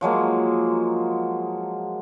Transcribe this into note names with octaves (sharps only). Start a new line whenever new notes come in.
F3 F#3 G#3 A#3